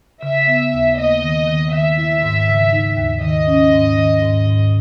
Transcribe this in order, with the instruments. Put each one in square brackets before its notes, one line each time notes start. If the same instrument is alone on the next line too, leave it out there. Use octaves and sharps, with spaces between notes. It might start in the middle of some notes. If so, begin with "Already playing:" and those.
[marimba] C#3 [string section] E5
[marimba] B3
D#2
[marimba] A#3 [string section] D#5
[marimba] D#3
D#3
[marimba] D#3 [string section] E5
[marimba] E4
G#2
C#3
D#4
D#2
[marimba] D#3 [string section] D#5
[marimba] C#4
G#2
D#3
G#2
G#2